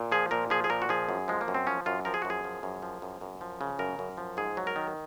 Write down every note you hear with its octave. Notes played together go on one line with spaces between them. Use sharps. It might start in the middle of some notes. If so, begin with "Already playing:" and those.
Already playing: A#2
F3 G#4
A#2 A#4
F3 G#4
G#4
A#2 A#4
F#4
F3 G#4
F#2
F3 G#3
A#3
F#2
C4
F3 C#4
F#2 F4
F3 A#4
G#4
F#2 F#4
G#4
F3
F#2
F3
F#2
F#2
F3
C#3
F#2 A#4
F#2
F3
G#2 G#4
F#3
A#4
D#3